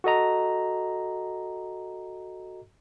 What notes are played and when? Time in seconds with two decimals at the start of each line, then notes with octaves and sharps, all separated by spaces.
0.04 F#4 A4 D#5 A#5